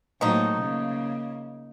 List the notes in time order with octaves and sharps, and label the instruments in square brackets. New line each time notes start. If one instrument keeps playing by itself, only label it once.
[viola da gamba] A2 F#3 A#3 [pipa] F3 D#4
[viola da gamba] C#3 A#3